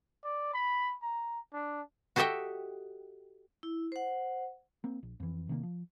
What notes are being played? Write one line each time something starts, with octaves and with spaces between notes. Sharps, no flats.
D5
B5
A#5
D4
F#4 G4 A4 D#5 E5 G5
E4
C5 F#5
A#3 C4
A#1
F2 E3
C3 D#3 G#3 A#3
F3